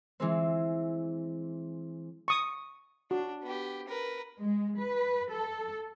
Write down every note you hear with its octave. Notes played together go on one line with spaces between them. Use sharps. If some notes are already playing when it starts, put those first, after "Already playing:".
E3 G#3 C4
C#6 D#6
D4 F#4
B3 G4
A#4 B4
G#3
B4
A4